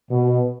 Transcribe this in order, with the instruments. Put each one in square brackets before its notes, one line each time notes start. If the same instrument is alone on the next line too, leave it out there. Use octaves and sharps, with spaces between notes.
[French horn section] B2